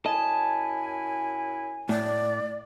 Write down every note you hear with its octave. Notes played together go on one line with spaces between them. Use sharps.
F#2 E4 D#5 G#5 A5
A2 D5